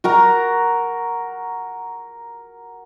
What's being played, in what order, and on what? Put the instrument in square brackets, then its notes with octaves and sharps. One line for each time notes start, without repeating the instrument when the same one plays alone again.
[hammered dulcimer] F#4 A#4 A#5